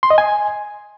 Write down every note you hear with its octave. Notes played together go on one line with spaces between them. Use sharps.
C6
D#5
G#5